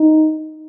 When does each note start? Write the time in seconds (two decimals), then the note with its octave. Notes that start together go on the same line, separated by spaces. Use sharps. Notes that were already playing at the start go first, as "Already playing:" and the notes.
Already playing: D#4